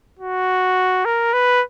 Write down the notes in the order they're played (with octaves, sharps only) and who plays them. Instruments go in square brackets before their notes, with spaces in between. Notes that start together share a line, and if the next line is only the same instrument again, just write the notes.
[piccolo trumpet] F#4
A#4
B4